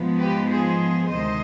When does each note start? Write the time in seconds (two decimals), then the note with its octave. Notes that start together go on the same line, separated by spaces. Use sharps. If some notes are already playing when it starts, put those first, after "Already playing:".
Already playing: G#2 F3 G#3 B3
0.18 G4 B4
0.49 G#4 C5
1.10 D2 C3 D#3 G#3 C5 D#5